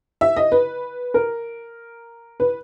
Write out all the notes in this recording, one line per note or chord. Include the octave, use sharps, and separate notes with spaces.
E5
D#5
B4
A#4
B4